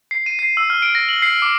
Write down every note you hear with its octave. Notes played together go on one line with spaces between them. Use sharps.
C7
D#7
C7
E6
F6
D7
A#6
F#7
C7
D6